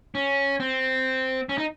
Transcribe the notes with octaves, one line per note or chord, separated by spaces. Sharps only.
C#4
C4
C#4
D#4